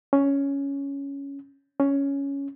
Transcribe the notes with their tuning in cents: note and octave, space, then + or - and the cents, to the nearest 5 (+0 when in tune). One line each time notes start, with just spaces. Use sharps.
C#4 +5
C#4 +5